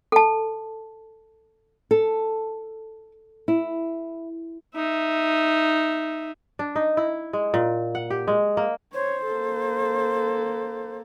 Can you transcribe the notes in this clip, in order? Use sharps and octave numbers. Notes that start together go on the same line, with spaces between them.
A4 A5
A4
E4
D#4 E5
D4
D#4
E4
G#3
A#2
F#5
G4
G#3
A#3
C5 C#5
A#3 A4